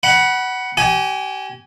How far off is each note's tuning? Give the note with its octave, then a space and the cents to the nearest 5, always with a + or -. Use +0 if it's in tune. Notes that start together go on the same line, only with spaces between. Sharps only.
F#5 +15 B5 -20
G4 -35 G#5 +0